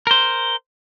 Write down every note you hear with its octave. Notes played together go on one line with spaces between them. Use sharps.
A#4 C5